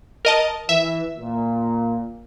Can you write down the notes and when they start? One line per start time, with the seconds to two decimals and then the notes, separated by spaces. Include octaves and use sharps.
0.25 A#4 D#5 A5
0.69 E3 E5
1.17 A#2